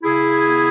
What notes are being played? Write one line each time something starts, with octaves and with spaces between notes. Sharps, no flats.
C#3 E4 G#4
C#3
B3